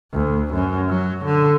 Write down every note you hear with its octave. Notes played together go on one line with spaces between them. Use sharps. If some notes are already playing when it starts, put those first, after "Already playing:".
D2
F#2
F#3
D3